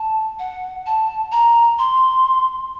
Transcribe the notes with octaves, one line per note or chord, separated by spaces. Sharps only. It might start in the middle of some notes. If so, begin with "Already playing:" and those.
Already playing: A5
F#5
A5
A#5
C6